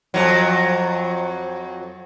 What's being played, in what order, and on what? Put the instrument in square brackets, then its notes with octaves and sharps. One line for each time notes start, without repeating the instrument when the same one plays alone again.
[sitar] F2 F#3